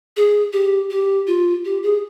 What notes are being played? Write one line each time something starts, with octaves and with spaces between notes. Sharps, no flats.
G#4
G4
G4
F4
G4
G#4